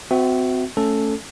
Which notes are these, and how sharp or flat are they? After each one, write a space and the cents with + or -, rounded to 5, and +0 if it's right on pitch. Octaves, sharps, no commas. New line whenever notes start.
C4 -30 F#4 +0 E5 -15
A3 +0 C#4 +0 A4 +0